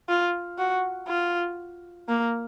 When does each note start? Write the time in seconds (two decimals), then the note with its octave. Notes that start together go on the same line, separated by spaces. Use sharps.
0.09 F4
0.58 F#4
1.08 F4
2.08 A#3